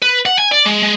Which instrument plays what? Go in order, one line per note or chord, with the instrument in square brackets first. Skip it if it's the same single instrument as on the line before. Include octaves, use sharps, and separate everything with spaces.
[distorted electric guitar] B4
F#5
G#5
D5
G#3
G#3